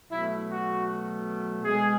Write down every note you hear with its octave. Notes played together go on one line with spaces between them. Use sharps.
B2 F#3 A3 E4
F#4
B2 G#3 G#4